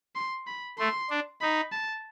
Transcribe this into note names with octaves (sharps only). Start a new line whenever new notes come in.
C6
B5
A3 C6
D4
D#4 B5
A5